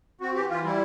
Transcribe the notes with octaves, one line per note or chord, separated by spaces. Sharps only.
C4 F#4
E3 G4
E3 F4
G3 E4